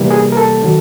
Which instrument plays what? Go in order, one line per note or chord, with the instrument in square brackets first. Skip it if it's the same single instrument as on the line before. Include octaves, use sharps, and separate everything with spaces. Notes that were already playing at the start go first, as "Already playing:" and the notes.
Already playing: [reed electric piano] C3 E3 G3 A#3
G#4
A#4
A4
D#3 F#3